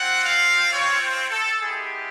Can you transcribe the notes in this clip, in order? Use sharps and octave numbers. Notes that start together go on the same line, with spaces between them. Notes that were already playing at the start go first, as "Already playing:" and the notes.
Already playing: C4 F4 F#5
F5
C#5
C5
A4
G#3 B3 E4 G4 G#4